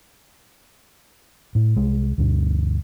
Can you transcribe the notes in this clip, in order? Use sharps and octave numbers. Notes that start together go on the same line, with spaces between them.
A2
C2 G#3
D2 G2 B2